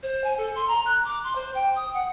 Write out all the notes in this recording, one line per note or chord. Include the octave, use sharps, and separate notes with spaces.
C5
G#5
A4
C6
A#5
F#6
D6
C6
C5
G5
D#6
F#5